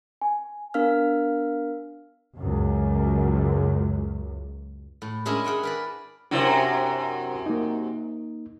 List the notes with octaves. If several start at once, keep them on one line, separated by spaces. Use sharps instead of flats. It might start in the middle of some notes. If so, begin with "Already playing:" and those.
G#5
B3 D4 A#4 F5 F6
C#2 F#2
A2
G#3 C#4 D4 E4 G#4 A#4
G#4 F#5 G5 C6
A#4 B4 D5
F#2 C3 F#3 D4 E4 C5
A#3 D#4